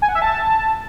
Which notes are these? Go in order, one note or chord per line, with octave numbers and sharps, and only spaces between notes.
G#5
F#5
E5
A5